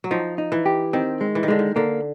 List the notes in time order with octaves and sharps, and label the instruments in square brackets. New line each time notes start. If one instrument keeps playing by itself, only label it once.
[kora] F#3
[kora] F3 [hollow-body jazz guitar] D#4
[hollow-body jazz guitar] D#4
[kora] E3
[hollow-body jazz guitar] G4
[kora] D#3 [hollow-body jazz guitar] C4
[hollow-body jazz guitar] G#3
[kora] E3
D#3
[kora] D3 [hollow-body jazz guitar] G#3
[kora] D#3
[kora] D3 [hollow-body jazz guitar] A#3